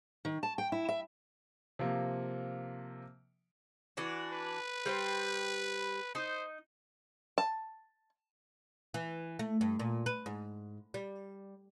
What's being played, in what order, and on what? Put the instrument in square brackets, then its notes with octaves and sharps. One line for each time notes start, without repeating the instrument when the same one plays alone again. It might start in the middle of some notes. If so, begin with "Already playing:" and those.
[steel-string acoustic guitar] D#3
A5
G5
E4
E5
[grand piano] C3 F3 A#3
[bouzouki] E3 D4 F#4
[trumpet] B4
[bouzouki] G3 C5 G5
[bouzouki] D#4 [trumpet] C5
[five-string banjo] A5
[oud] E3
A3
G2
A#2
B4
G#2
G3